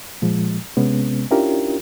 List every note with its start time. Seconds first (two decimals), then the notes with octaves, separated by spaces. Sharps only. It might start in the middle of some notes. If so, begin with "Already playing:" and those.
0.22 A#2 F3 G#3
0.77 C3 G#3 B3 C#4
1.31 C#4 D4 E4 F4 G4 A#4